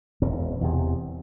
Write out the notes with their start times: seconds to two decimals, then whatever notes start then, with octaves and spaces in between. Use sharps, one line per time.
0.22 E1 C4
0.61 E2 C3